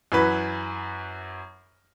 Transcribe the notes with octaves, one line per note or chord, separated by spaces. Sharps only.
F#2 E3 F#4 B4